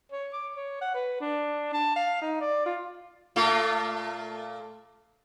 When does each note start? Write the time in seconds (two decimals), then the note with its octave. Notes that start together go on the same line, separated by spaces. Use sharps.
0.12 C#5
0.33 D6
0.56 C#5
0.82 F#5
0.95 B4
1.21 D4
1.73 A5
1.96 F5
2.22 D#4
2.41 D5
2.66 F4
3.36 A#2 A3 F4